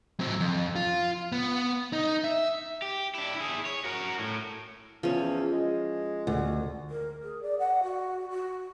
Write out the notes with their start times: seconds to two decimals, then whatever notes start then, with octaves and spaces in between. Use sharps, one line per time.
0.20 F#3 C4
0.40 F2
0.76 F4
1.32 B3
1.93 D#4
2.24 E5
2.82 G4
3.15 D4 E4
3.36 E4 G#4
3.65 C#5
3.85 F#4 A#4
4.19 A2
5.03 E2 F3 C#4
5.52 G#3
6.27 D2
6.90 A#4
7.23 G#4
7.43 D5
7.59 F#5
7.83 F#4
8.31 F#4